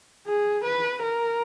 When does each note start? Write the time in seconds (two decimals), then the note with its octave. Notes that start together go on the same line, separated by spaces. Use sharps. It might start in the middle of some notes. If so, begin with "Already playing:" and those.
0.27 G#4
0.64 B4
1.03 A#4